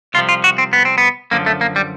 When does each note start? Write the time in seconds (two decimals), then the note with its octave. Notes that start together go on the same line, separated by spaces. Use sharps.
0.14 C2 C3 F3 F4
0.29 F4
0.44 F#4
0.58 C4
0.73 B3
0.85 C4
0.98 B3
1.31 F#2 D3 F3 A#3
1.46 A3
1.61 A#3
1.76 G3